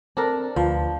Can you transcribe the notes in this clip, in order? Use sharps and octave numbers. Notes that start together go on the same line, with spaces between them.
C4 D4 A4 A#4
D2 F3 B4